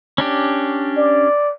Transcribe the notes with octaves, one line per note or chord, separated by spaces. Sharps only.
C#4 D4 G4
D5